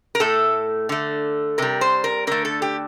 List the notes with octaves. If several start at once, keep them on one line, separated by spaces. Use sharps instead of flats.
A#4
A2 A3 A4
D3 A3
C3 G3 A#4
C5
A#4
D3 A3 A#4
A4
G4